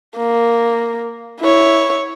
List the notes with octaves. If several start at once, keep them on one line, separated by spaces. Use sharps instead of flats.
A#3
E4 C#5